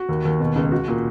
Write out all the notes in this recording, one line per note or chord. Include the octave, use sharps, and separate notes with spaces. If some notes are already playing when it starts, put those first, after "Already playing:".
Already playing: F#4
D#2
D#2
B2
C#2
F#4
A#2